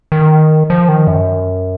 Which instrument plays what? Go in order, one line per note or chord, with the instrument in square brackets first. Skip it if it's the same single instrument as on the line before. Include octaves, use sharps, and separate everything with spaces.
[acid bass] D#3
F3
D#3
F#2